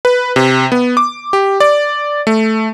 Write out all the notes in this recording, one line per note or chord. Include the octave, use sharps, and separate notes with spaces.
B4
C3
B3
D6
G4
D5
A3